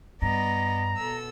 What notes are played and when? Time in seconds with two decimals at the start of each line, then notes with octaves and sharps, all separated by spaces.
0.22 G2 B3 D5 D#5 A#5 A#6
0.98 B2 A4 E6